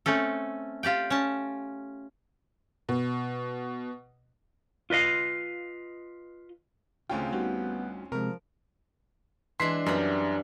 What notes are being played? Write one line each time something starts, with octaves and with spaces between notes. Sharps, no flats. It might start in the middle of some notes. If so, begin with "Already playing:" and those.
A3 C4 C#4 A4
F4 G4 D5 G5
C#4 A5
B2
F4 B4 D#5 F5
D2 C#3 C4 C#4 F4 G5
G3 B3 D#4 F#4
C3 F3 G#3 A#4
E3 G#3 D4 C6 B6 C7
F#2 G3 B3 A#5